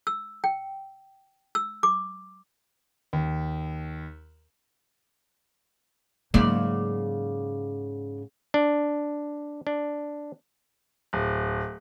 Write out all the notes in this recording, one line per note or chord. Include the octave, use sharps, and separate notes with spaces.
E6
G5
E6
D6
D#2
G#2 C#3 F#3 A#3 D5
D4
D4
D1